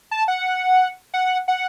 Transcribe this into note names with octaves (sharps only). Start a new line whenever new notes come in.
A5
F#5
F#5
F#5